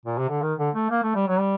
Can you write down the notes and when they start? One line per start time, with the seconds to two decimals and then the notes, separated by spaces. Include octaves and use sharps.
0.06 A#2
0.18 C3
0.29 D3
0.42 D#3
0.59 D3
0.75 A3
0.90 A#3
1.03 A3
1.15 G3
1.28 F#3
1.39 G3